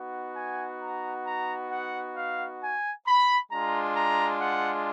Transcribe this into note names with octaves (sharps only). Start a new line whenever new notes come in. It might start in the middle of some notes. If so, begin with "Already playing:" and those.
Already playing: B3 D#4 F#4
G#5
A#5
A#5
F#5
F5
G#5
B5
G#3 D4 F4 A#5
A#5
F#5